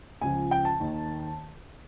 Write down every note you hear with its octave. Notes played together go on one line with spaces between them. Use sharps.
C#2 C#3 F3 G#5
G5
A5
D#2 D#3